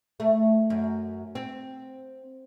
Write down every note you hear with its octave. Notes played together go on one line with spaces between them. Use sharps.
A3
F#2
C4